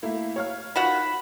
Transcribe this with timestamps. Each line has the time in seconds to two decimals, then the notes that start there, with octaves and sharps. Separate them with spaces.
0.03 A3 A#3 E4
0.36 C#5 F5 F6
0.76 D#3 F4 F#4 F#5 B5